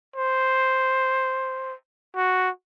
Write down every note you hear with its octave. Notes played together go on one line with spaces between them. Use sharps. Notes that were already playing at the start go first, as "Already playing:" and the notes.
C5
F#4